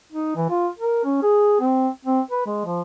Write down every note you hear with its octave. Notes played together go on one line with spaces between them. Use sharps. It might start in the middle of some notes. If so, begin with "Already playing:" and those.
D#4
E3
F4
A#4
C#4
G#4
C4
C4
B4
G#3
F3